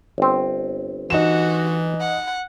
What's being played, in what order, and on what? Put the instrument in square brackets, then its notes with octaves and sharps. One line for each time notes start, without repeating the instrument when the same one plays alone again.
[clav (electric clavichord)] G1 C4
[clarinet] E3 [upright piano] D#4 E7 [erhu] F#4
[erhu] F#5